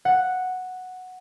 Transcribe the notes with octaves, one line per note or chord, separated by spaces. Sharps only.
F#5